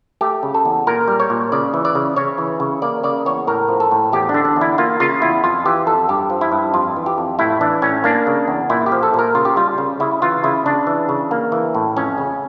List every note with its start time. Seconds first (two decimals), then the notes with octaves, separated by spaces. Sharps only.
0.21 A3 G4
0.43 C#3
0.54 A4
0.65 E2
0.87 A#2 A#4
1.08 G3
1.20 C#5
1.30 A#2
1.52 C#3 D5
1.74 E3
1.85 D5
1.95 C#3
2.16 C#3 C#5
2.38 E3
2.60 C#3
2.82 A#3 D5
3.04 C#3 D5
3.26 E2 C#5
3.47 A2 A#4
3.69 F3
3.80 A4
3.91 A2
4.12 E2 G4
4.29 D4
4.34 D3
4.45 D4
4.56 E2
4.61 E4
4.78 A#3 F4
5.00 C#3 F4
5.22 E2 E4
5.44 F2 F4
5.66 E3 G4
5.87 F2 A4
6.09 G2 G4
6.30 F3
6.41 E4
6.52 G2
6.74 F2 F4
6.96 E3
7.06 G4
7.18 F2
7.39 A2 E4
7.61 E3 D4
7.82 A2 C#4
8.04 A#3 D4
8.27 C#3
8.48 E2
8.70 A#2 E4
8.86 G4
8.92 F3
9.03 A4
9.14 A#2 A#4
9.35 C#3 F4
9.45 G4
9.56 G3 F4
9.78 C#3
10.00 C#3 E4
10.22 E3 F4
10.44 C#3 E4
10.66 C#3 D4
10.87 E3
11.09 C#3
11.31 A#3
11.52 E3
11.75 A2
11.97 F2 C#4
12.18 C#3